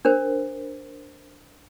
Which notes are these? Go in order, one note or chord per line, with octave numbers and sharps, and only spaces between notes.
D4 A#4 C5